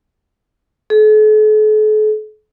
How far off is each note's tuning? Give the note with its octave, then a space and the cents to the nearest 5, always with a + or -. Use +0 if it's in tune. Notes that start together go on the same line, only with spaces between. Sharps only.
A4 -45